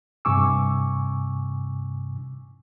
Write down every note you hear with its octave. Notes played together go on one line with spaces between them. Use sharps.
G2 C3 G#5 C#6 D6 E6